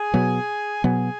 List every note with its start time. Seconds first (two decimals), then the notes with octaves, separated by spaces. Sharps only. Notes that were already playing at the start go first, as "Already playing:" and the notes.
Already playing: G#4 G#5
0.14 B2 F#3 B3
0.84 B2 F#3 B3 G#4 G#5